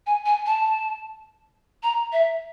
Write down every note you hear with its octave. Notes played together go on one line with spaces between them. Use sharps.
G#5
G#5
A5
A#5
E5